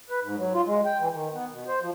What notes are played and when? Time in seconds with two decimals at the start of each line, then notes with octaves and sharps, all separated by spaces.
0.10 B4
0.23 G#2
0.38 F#3
0.54 F4
0.66 G#3
0.85 G5
0.99 E3
1.13 D#3
1.34 B3
1.51 B2
1.68 C5
1.81 F3